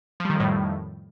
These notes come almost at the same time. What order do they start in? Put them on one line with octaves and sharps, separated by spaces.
F3 G3 D#3 F2 A2